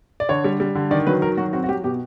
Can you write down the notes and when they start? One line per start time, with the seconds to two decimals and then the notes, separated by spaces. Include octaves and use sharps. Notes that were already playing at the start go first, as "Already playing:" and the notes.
0.20 D5
0.29 D3 C#5
0.44 G3
0.60 G3
0.75 D3
0.91 D#3 D5
1.07 F#3 B4
1.22 D#3 A#4
1.37 F#3 F#4
1.53 C4 F#4
1.64 F#4
1.69 F#3 G4
1.84 B2 G4